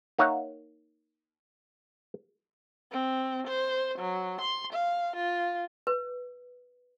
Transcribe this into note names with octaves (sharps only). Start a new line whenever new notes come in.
A#3 D#4 C#5 E5 F#5
C4
C5
F#3
C6
F5
F4
B4